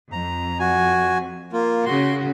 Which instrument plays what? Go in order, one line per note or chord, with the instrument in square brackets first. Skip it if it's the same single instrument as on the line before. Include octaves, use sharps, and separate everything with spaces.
[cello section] F2 [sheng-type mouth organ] A#5
[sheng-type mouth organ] F#4 G#5
A#3 F4
[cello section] C#3 F#4 [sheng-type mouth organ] C6